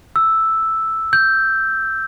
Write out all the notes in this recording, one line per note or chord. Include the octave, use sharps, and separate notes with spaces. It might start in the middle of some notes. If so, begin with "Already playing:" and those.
E6
G6